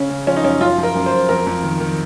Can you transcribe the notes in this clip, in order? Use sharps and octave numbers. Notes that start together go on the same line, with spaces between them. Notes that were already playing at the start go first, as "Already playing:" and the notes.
Already playing: C#3 C#4
C#3
F3 C#4
D#4
F#2 C#4
F#2 F4
F3
A#4
F#2
C5
F#2
F2 A#4
F2
D#3
D#3